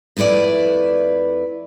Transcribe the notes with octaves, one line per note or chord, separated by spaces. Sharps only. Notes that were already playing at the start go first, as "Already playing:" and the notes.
F2 A3 E4 B4 D5